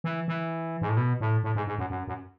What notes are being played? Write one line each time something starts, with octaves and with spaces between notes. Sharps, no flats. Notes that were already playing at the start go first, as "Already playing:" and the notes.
E3
E3
G#2
A2
B2
A2
A2
G#2
G#2
F#2
F#2
F#2